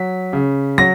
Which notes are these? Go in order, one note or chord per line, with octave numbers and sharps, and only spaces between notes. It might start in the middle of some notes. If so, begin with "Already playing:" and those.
Already playing: F#3 B6
C#3
F#3 A#6